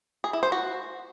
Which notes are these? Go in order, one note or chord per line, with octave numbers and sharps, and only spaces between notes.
G#4
E4
C5
F#4